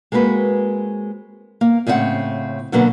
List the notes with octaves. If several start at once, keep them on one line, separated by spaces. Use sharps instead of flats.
G#3 A#3 C4 F#4 B4
A#3
A2 C#3 C4 D#5 F#5
B2 D3 F#3 A#3 B3